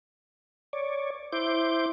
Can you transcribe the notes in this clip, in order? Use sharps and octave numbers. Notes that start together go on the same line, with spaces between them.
C#5 D5
E4 C5 D6 G6